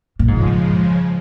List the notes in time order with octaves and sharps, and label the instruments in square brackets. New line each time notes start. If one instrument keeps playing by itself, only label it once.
[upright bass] A#2
[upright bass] G#2 [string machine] C#3 F3 G#3